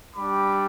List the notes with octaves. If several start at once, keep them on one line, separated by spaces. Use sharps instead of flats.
G3 D4 G4 B5 D6